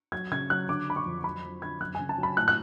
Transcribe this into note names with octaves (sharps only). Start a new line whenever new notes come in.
F#3 G#6
C#3 G#6
F#3 F#6
D3 D6
D4 B5
C#6
F2
F#3 B5
F#3
D3 G#6
F#2 F#6
G#5
C#3
A5
F#3
B5
A2 F#6
F#6